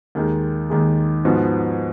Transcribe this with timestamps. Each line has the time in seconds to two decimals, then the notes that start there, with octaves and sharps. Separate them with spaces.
0.15 D#2 D#3 G#3
0.70 D#2 D#3 G#3
1.25 G#2 F3 B3 F#4